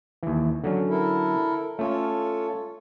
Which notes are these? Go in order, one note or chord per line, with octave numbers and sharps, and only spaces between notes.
D#2 E3
D3 F#3 C#4
E4 A4 A#4
A3 C#4 F4 A4 C#5